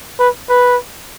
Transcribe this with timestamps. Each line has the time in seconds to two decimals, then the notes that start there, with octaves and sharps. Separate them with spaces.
0.19 B4
0.49 B4